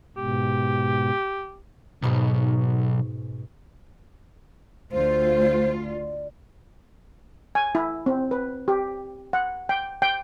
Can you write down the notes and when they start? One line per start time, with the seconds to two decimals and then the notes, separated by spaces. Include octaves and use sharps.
0.17 G#2 B2 G4
2.02 B1 G#2 B2 C#6
4.92 D2 F4 C5
5.82 D5
7.55 G#5
7.75 E4
8.06 C4
8.31 B4
8.68 G4
9.33 F#5
9.69 G5
10.02 G5